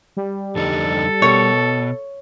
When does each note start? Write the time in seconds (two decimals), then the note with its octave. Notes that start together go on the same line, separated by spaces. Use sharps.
0.17 G3
0.56 F2 D3 D#4 A4
1.22 B2 C#5